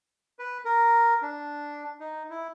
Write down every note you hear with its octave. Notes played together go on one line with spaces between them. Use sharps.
B4
A#4
D4
D#4
E4